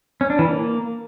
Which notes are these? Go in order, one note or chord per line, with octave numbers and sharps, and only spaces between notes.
C#4
D4
E3
A#3